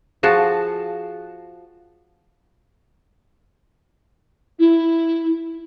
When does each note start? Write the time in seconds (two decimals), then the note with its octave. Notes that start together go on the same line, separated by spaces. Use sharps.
0.23 F3 F#4 G#4 A5
4.59 E4